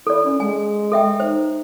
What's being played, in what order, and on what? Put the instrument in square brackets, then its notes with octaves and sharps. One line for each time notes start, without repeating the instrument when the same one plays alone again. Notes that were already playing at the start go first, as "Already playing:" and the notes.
[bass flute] E4 [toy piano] A4 D5
[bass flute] C#4
[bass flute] G#3 [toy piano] G#5
[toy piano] A4 E5 G5
[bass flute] D#4 [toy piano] C5